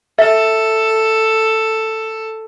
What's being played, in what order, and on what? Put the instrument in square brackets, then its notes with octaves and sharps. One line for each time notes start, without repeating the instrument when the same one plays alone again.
[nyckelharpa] A4 [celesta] E5